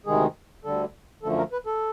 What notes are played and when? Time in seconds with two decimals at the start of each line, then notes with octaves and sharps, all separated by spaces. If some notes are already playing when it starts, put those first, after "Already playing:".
0.06 D2 C3 D#3 G#3 G#4
0.64 D2 D3 G3 A4
1.22 F#2 D3 F3 A3 A4
1.37 A#4
1.52 B4
1.66 A4